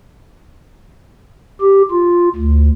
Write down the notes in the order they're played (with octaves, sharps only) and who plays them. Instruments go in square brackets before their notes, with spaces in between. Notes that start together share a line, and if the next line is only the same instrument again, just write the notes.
[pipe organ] G4
F4
D2